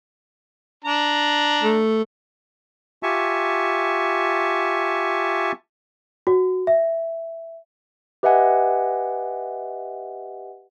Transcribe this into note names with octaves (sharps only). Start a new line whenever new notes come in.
D4 A#5
A3
F4 G4 E5 G#5 A5 C#6
F#4
E5
G4 B4 D#5 E5 F#5 G#5